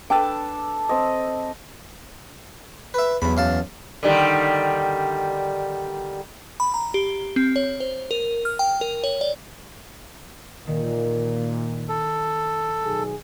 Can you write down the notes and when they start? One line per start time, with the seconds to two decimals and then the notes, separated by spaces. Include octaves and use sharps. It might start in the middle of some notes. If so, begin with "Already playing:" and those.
0.10 D4 A4 B4 G5 A5
0.89 C4 D#5
2.94 B4 E5
3.22 B1 E2 B5
3.37 F#2 F5 A5
4.03 D3 D#3 G3
6.60 B5
6.74 A#5
6.94 G4
7.36 C4
7.56 C#5
7.80 C5
8.11 A#4
8.45 F6
8.59 G5
8.81 A#4
9.04 C#5
9.21 D5
10.67 A#2 D#3
11.89 A4
12.84 B1 G#4